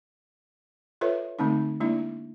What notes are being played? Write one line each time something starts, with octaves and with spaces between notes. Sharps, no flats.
F4 A4 B4 C#5 E5
D3 G#3 A3 C4 D#4
G#3 A#3 D4 E4 D5